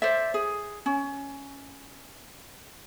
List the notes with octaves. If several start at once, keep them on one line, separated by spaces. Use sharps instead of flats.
C5 D5 E5
G#4
C#4